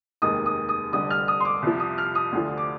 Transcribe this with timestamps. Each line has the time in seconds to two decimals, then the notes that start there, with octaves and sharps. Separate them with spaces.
0.22 F1 D#2 D#3 G#3 D#6
0.46 D#6
0.69 D#6
0.92 F1 F2 D3 G3 D#6
1.10 F6
1.28 D#6
1.40 C6
1.45 D6
1.62 C2 C3 F3
1.80 D#6
1.98 F6
2.15 D#6
2.32 D2 D3 F3
2.57 D6